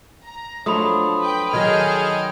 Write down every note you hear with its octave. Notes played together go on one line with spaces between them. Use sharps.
A#5
F3 F#3 A3 D4 B5 C6 D#6
B4 G5
D#3 F#3 G#4 A4 D#5 G5 F6 G#6